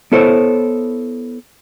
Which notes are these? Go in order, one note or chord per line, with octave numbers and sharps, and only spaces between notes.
B3 E4 A4 C5 C#5